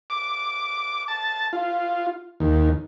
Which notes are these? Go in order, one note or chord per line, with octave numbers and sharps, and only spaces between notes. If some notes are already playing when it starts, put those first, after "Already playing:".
D6
A5
F4
D#2